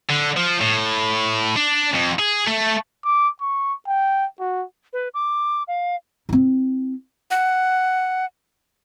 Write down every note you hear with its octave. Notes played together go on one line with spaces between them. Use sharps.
D3
F3
A2
D4
F2
G#4
A3
D6
C#6
G5
F#4
B4
D6
F5
C4 E4
F#5